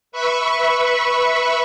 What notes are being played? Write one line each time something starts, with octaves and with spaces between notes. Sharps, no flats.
B4 E5 B5 C#6